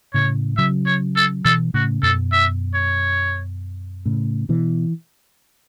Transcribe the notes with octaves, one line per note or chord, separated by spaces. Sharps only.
A2 C#3 C#5
C#3 F#3 E5
C#5
A4
B2 E3 A4
A2 C#3 F#4
F#2 B2 A4
E5
C#5
A2 C#3
B2 E3